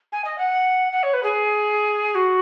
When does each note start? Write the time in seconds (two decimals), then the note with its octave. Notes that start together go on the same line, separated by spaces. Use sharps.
0.12 G#5
0.24 D#5
0.38 F#5
0.92 F#5
1.03 C#5
1.13 B4
1.23 G#4
2.15 F#4